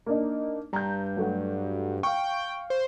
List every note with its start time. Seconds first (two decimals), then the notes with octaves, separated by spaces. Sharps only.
0.06 A#3 D4 D#4
0.73 G2 A#5 G6
1.17 F#3 A3 F#4
2.03 F5 G5 C#6
2.70 C5